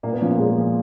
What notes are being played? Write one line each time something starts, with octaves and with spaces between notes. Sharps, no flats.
A#2 A#3
B3
F3 C#4
A#3
A#2 G#3
F3